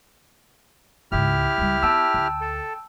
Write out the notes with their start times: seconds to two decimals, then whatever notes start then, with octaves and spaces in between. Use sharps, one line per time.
1.12 C#2 G#2 E4 G4 F6
1.58 C#2 G3
1.83 B3 G5 A5 E6
2.14 D2
2.41 A4